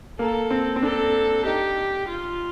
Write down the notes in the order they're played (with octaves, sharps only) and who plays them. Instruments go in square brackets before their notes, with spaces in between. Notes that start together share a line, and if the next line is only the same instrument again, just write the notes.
[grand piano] A#3 [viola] A4
[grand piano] C4
C4
[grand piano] D4 [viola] A4
[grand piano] D#4 [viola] G4
[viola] F4